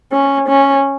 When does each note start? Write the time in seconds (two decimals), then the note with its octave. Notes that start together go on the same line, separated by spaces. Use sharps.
0.13 C#4
0.48 C#4